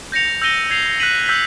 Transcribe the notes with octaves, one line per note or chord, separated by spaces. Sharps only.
G6 A#6 C#7 F7
E6 G6 A#6 D#7 G7
G#6 C7 F7
F#6 B6 D#7 F#7
E6 G6 B6